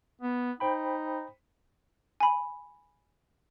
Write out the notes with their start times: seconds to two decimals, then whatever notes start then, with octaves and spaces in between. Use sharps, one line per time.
0.22 B3
0.60 D#4 C5 G5 B5
2.20 G#5 B5